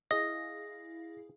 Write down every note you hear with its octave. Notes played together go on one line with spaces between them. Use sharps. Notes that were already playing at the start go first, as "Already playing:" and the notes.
E4 G#4 D#5 F5 A#6